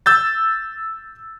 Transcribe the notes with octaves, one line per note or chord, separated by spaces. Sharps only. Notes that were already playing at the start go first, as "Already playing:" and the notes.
E6 G6 A6